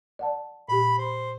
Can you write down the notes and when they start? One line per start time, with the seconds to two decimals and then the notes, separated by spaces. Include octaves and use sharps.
0.19 D5 F#5 A5
0.69 A#2 G4 B5
0.98 C5